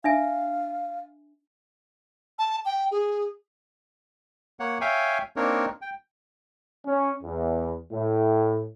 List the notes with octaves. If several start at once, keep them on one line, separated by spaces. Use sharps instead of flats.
D4 E5 F5 G#5
A5
G5
G#4
A#3 C#5 F#5
C#5 E5 F5 G5 G#5
A#3 C4 D4 D#4 A#4 C#5
G5
C#4
E2
A2